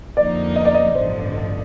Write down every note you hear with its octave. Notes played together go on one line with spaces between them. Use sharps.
F2 D3 F3 A#3 D#4 D5
D#5
D5
D#5
A1 G2 D3 F3 C5